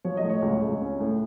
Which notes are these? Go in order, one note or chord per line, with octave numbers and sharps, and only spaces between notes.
F3 C#5
D#5
A2
C#5
C#2
C#2
C#4
A2